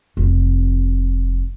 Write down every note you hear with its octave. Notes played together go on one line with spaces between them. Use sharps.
F1 C4